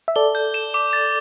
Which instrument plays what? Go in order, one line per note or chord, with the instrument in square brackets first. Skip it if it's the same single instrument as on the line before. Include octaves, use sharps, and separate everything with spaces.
[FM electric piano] E5
[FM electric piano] A4 D5 [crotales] G7
[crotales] G6
E7
D6
A6